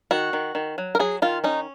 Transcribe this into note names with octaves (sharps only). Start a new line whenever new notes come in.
D#3 F#4
D#3
D#3
F#3
A#4
F#3 G#4
D#3 F4
C#4 D#4